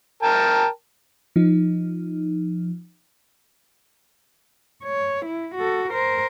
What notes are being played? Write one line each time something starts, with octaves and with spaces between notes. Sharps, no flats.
A#4 G5 A5
F3 D#4
C#5
E4
F#4 A4
A#4 C5